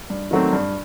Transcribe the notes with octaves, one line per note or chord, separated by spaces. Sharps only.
G2
D#3 F#3 A3 C4
G2